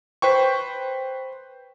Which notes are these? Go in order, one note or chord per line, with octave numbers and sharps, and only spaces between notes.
B4 C5 G5 C#6